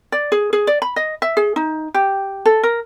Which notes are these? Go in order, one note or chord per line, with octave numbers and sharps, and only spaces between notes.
D5
G#4
G#4
D5
B5
D#5
E5
G#4
D#4
G4
A4
A#4